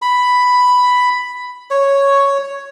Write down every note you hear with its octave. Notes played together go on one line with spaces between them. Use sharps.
B5
C#5